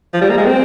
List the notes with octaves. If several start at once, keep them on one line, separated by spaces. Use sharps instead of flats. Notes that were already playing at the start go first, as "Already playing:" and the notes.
F3
G3
A#3
G#3
C4